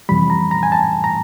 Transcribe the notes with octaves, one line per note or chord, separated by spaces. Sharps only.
F2 C3 E3 G3 B5
A#5
A#5
G#5
A5
A#5